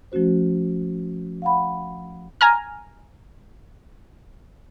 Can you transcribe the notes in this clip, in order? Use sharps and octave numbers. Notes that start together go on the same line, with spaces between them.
F3 A3 C#4 F#4 C5
F5 F#5 B5
G#5 A#5 F6